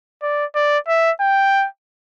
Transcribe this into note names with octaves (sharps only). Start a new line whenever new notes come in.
D5
D5
E5
G5